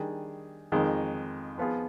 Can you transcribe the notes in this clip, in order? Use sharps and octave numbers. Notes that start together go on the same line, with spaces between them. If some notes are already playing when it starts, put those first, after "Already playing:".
Already playing: D#3 G3 D4 G#4
F2 D#3 G#3
F3 B3 F4 G#4